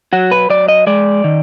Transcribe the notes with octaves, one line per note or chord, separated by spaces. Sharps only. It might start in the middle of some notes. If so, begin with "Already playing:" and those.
F#3 F#4
B4
F#3 D5
D#5
G#3 D5
D#3